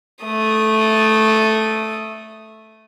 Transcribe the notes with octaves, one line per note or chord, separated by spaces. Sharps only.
A3 D#6